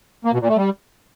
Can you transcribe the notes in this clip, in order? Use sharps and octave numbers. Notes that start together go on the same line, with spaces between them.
A#3
B2
A#2
A3
G3